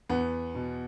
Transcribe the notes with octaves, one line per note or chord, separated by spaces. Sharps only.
E2 B3
B2